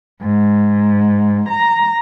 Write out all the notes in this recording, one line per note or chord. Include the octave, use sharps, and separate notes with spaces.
G#2
A#5